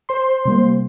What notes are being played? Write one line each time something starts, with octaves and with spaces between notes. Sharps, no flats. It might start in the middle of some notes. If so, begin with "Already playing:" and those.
C5 C6
C3 G3 A#3